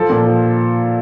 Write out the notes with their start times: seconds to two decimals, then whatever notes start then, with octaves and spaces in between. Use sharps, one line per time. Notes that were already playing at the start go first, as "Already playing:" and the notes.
Already playing: F3 A4
0.10 A#2
0.26 F3